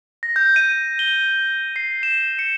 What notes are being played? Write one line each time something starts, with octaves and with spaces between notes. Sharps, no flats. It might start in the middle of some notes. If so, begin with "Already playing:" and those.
A#6
G6
D#7
G7
C7
E7
C#7